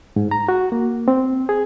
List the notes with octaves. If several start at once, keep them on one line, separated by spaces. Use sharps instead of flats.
G#2
A#5
F#4
A#3
C4
G#4